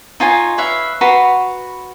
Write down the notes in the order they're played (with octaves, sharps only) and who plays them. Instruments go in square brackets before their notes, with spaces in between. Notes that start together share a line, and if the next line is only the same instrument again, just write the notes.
[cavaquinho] D#4 F4 C#5 G#5
B4 C#5 E5 F5
F#4 B4 A#5 C6